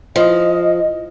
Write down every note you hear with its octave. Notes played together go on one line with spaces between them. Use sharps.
F3 D#5